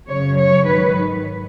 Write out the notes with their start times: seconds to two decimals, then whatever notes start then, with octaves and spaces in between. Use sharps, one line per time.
0.08 F#2 C#3 F#3 C#5
0.38 C#5
0.65 G#2 D#3 F#3 B4